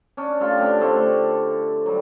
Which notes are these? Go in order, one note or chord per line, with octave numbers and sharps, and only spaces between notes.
C#4 D4
A3 F4 G4 A4
D3 C4 D4
D3 A3 C4 A4
F#3 G3